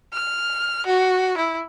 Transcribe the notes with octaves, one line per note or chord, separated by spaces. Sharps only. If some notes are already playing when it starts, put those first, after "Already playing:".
F6
F#4
E4